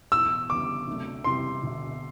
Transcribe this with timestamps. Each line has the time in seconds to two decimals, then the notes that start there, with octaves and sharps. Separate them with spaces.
0.12 B1 A2 E3 B3 E6
0.50 F#1 E2 D3 G3 B3 D6
0.87 D2 C3 F#3 A3 D4
1.24 F#1 E2 C3 E3 G3 C6
1.62 E1 D2 D3